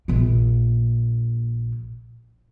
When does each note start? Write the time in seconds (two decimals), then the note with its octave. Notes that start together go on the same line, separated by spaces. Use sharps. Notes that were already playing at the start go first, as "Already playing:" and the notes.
0.08 A#1 A#3